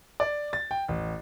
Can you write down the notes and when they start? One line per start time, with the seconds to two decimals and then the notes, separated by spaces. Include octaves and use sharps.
0.20 D5
0.53 A6
0.71 G5
0.88 A1